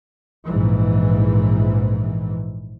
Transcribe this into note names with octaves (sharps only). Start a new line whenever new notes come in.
A#1 G#2 E3